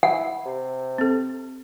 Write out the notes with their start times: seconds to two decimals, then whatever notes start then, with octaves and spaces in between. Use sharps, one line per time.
0.03 E4 F#5
0.46 C3
0.98 C4 A4